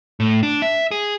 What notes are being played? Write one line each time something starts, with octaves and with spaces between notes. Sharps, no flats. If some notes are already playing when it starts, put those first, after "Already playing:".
A2
D4
E5
G#4